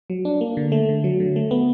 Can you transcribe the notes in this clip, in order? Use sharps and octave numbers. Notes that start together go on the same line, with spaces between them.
F#3
D4
A#3
D3
A3
D3
F#3
D3
A3
B3